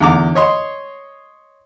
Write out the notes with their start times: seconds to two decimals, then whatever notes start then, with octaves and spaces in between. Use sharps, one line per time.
0.01 E2 D3 A#5 D6
0.35 C#5 D#5 C6